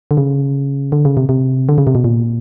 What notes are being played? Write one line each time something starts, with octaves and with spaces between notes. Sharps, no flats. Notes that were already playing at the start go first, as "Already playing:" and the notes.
D3
C#3
D3
C#3
C3
C3
D3
C#3
C3
B2
A#2